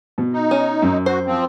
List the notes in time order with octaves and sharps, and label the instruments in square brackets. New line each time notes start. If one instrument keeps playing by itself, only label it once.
[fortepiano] B2
[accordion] D#4
[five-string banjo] C#4
[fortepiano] F#2
[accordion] F#4 [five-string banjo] C5
[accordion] F3 C4